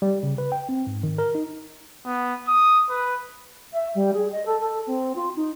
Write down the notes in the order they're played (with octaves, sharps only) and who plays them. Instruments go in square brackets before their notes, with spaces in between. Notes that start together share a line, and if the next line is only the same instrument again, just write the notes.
[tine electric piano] G3
C#3
B4
G5
C4
G#2
D#3
A#4
D#4
[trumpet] B3
D#6
B4
[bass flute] E5
G3
G#4
D#5
A4
A4
C4
F4
D#4